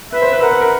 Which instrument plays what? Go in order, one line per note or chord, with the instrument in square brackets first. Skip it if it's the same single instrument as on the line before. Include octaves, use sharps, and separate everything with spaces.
[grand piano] B4 [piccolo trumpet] E5
[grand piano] C5
B4
[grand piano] A#4 [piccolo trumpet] F#5
[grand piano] B4
A#4